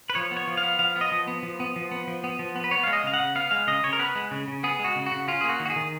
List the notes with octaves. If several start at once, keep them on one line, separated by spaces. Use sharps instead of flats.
B4
F3 C#5
B3
C#5
F3
F5
B3
F3 F5
B3
D#5
F3
B3
F3
B3
F3
B3
F3
B3
F3
B3
B4
B3 C#5
G#3 F5
D#5
C#3 F5
F#5
C#3
B3 F5
G#3 F5
C#3 D#5
C#3 C#5
A#4
B3 B4
G#3
C#3
C#3
B3 G#4
G#3
F#4
C#3
F#4
C#3
C#4 F4
G#4
A#3
F#4
D#3
F#4
G#4
D#3